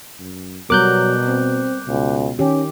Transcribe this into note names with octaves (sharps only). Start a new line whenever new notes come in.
F#2
B2 F#3 G3 B3 A#4 D6 F#6 G6
C4
C#2 B2
D#3 C#4 G4